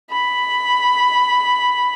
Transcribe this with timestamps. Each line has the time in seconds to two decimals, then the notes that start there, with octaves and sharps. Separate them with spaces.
0.11 B5